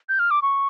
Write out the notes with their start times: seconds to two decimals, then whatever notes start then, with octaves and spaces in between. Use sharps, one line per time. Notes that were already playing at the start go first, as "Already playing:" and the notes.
0.09 G6
0.19 F6
0.31 D6
0.42 C#6